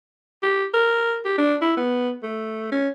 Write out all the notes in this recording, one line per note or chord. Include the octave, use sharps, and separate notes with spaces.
G4
A#4
G4
D4
E4
B3
A3
C#4